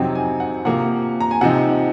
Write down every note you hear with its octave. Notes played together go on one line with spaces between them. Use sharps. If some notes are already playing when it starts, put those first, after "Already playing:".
Already playing: F2 C3 F#3 C4 D#4 F#5
G#5
F#5
C3 F3 A#3 F#5
A#5
G#5
C3 F3 C4 D#4 F#5